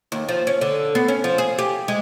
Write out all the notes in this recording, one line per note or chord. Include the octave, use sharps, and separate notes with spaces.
D#2
F3
C#4
D3
B3
C#4
F3
G#4
G4
G#3